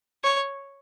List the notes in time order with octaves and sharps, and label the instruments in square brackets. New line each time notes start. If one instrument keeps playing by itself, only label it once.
[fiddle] C#5